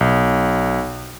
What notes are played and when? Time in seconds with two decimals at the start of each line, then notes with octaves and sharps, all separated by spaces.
0.01 B1